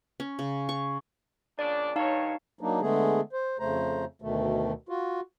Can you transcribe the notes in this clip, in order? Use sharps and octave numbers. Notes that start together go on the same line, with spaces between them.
C#4
C#3
C#6
A#2 C#3 D4 D5
G2 D#3 D#4 C#5 F5 A5
F#3 A#3 D4 D#4
D3 G#3 A3 B3 G#4
C5
F2 C#3 A3 C5 A#5
D2 B2 D#3 A3
F4 F#4